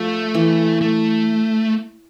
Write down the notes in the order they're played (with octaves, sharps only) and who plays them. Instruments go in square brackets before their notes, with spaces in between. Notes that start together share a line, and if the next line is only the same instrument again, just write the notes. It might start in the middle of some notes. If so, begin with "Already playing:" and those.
Already playing: [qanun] F3 [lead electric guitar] A3
[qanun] E3
[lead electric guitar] A3